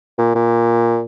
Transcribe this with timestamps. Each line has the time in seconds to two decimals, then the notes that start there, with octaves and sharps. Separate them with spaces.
0.18 A#2
0.35 A#2